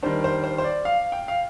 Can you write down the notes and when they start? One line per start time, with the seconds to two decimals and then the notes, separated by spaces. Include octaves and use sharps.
0.03 D#3 G3 D4 C5
0.24 C5
0.44 C5
0.58 C5
0.64 D5
0.85 F5
1.12 G5
1.28 F5